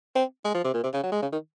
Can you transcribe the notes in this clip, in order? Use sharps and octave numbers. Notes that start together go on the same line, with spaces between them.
C4
G#3
F3
C3
A#2
C3
C#3
F#3
G#3
C#3
D#3